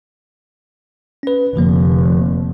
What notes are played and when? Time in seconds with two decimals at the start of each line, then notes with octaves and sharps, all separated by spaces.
1.23 C#4 B4
1.56 F1 D3 F3 A#3